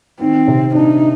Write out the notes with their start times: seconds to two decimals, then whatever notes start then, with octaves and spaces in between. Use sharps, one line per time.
0.21 D#3 C4
0.48 C3
0.75 D4 D#4